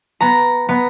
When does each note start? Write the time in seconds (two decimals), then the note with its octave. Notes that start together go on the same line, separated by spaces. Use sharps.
0.21 B3 A#5
0.69 B3 A#5